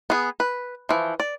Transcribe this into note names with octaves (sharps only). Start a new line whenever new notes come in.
B3 G#4
B4
E3 F3
D5